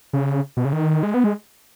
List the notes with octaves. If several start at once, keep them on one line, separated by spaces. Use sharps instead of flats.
C#3
B2
C#3
D#3
G#3
B3
G#3